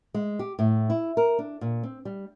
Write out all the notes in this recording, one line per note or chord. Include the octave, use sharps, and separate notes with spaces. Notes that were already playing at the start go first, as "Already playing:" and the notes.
G#3
G4
A2
E4
A#4
D4
A#2
C4
G3